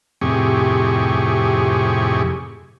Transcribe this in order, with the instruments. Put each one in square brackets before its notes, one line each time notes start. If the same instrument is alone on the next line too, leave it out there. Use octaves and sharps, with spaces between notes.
[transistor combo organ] F2 A2 C3 G4 G#4 C#6